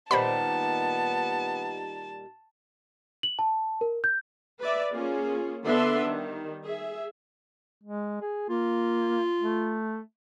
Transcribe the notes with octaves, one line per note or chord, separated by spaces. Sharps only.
A#2 D#3 G3 B3 C5 A5 B5
F#7
A5
A#4
G6
B4 D5 E5
A#3 C#4 F4 G#4
D3 B3 D4 B4 E5 C6
D#3 G3
G#4 E5
G#3
G#4
A#3 F4
A3